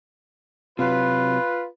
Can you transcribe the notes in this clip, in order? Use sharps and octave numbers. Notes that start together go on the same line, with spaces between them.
C3 F#3 F4 B4